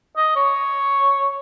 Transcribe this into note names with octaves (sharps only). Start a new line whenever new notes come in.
D#5
C#5